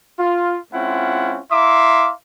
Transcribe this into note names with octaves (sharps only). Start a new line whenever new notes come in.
F4
G#3 C4 C#4 E4 F4 F#5
E4 E5 F5 A#5 C6 D6